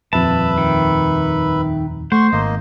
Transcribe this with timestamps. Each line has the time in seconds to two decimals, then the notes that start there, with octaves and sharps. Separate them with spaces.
0.13 D#1 F2 B4 E5 A5 B5
0.58 D#3
2.12 A3 C5 F#5 C6 C#6
2.32 G#1 A#3 D#5